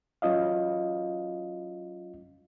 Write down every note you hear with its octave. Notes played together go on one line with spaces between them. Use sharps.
F#3 C#4 F4 D#5 F5